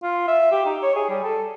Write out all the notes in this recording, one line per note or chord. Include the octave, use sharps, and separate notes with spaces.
F4
E5
G4
D#4
C#5
G#4
G3
A4